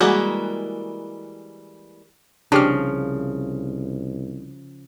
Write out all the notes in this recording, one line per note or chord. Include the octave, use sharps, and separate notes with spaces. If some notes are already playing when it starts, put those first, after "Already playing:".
E3 G3 G#3 A#3 F#4
C2 C#3 F3 D4 G4 F6